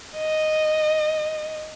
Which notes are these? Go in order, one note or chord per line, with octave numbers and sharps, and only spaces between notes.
D#5